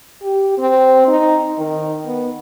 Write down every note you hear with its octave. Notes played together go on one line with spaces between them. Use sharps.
G4
C4
D#4
D#3
B3